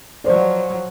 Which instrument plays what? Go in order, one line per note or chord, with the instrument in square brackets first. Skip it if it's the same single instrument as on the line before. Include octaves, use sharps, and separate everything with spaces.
[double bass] F3 F#3 [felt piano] C5 D5